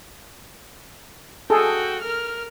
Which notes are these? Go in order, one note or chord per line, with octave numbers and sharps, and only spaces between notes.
F#4 G#4 A4 G5
A#4 F6